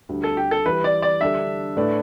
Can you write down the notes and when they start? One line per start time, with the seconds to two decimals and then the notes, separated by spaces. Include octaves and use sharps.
0.09 D2 D3 G3
0.24 A4
0.37 G4
0.51 A4
0.66 E3 G3 E4 B4
0.84 D5
1.02 D5
1.21 D3 G3 D4 A4 D5 E5
1.77 A2 A3 D4 B4 D5